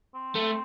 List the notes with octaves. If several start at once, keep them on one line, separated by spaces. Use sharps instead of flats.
C4
A3